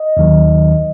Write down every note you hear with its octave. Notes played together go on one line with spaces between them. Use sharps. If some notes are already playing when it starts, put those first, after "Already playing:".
Already playing: D#5
D#2 D#3 F#3